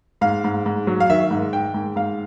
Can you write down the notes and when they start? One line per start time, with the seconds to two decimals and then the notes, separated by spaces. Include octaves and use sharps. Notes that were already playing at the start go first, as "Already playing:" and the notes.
0.21 G#2 F5
0.44 G#2
0.66 G#2
0.87 F#3
1.00 F5
1.10 D#3 E5
1.31 G#2
1.53 D#3 G5
1.74 G#2
1.96 G#2 F5